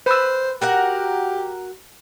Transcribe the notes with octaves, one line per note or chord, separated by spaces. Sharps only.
B4 C5 E6
F#4 G4 A#4 F#5